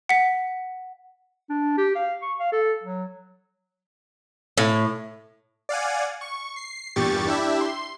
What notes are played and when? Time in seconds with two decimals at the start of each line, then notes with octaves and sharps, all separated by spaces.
0.09 F#5 B6
1.50 D4
1.78 G4
1.96 F5
2.22 C#6
2.39 F5
2.52 A4
2.83 F#3
4.58 A2
5.69 D5 F5 F#5 G#5
6.21 C#6
6.56 C7
6.96 E2 G2 A#2 G4 C#6 A6
7.27 D4 E4 G4 E5
7.61 C6